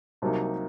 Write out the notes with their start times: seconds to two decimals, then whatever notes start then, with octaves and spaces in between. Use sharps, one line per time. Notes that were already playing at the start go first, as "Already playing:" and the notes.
0.22 C2 C3 F#3 A#3 D#4